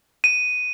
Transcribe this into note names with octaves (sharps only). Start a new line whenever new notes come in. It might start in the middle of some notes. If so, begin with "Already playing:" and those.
D#7